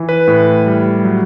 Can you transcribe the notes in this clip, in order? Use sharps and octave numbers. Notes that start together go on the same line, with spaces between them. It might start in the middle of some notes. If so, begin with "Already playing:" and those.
Already playing: E3
B4
A2
G3
F#3